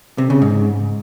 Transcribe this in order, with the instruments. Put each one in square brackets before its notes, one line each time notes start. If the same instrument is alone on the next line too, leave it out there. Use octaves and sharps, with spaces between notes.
[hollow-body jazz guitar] C3
C#3
G#2